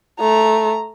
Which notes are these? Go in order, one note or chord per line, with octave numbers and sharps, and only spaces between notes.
A3 A#5